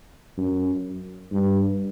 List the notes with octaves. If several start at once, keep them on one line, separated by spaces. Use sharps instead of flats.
F#2
G2